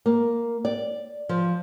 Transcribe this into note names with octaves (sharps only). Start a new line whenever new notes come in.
A#3
D5
F3